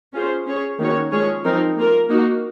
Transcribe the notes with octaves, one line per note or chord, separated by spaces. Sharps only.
C#4 F4 G#4 C5
C#4 G#4 C#5
D#3 A#3 C#4 F#4 C#5
F3 G#3 C#4 G#4 C#5
F3 C4 D#4 A#4
A#3 F4 A#4
A#3 D#4 F#4